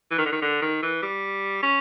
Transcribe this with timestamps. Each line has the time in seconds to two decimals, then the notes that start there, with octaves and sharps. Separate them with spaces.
0.11 E3
0.18 D#3
0.25 D3
0.32 D#3
0.42 D3
0.62 D#3
0.82 E3
1.02 G3
1.63 C#4